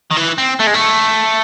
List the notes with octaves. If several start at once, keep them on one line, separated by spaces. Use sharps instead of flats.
D#3
E3
C4
A3
G#3
A3